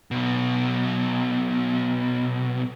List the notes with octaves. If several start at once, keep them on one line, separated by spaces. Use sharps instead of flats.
B1 B2